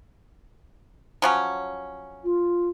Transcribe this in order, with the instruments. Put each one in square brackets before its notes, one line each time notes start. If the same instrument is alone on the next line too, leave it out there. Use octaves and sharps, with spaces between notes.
[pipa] F3 F#3 C#4
[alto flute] F4